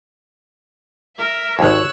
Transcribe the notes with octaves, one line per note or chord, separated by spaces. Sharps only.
A#4 E5
G#1 D#2 C#5 E6 F#6